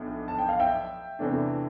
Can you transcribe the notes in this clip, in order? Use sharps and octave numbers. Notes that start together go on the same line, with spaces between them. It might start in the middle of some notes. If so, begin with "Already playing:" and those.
Already playing: B1 A2 F3 B3 D4
A5
G5
F5
E5 G5
E2 C3 E3 A3 D4